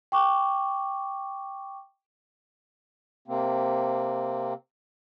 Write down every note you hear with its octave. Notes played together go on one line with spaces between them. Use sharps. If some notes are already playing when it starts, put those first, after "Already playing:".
G5 C#6 D6
C3 A#3 C4